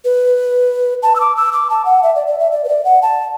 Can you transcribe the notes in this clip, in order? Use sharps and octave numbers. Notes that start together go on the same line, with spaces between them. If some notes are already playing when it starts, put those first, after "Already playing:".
B4
A5
E6
D6
E6
D6
A5
F#5
E5
D5
D5
E5
D5
B4
D5
F#5
A5